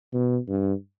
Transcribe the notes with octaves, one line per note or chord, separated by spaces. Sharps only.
B2
G2